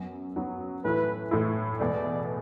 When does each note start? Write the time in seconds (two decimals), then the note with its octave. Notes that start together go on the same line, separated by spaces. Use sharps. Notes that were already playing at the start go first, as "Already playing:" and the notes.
Already playing: F#2 F#3 B3
0.36 F#2 F#3 B3
0.84 A2 E3 A3 E4 B4
1.31 A2 E3 A3 E4
1.80 E2 B2 A3 D5